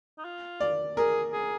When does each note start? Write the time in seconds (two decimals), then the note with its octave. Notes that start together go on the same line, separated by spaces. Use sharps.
0.18 D#4
0.25 F4
0.60 D5
0.97 G#4 A#4
1.32 G#4